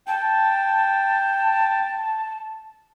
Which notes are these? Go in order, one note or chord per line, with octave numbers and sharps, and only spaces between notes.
G5 A5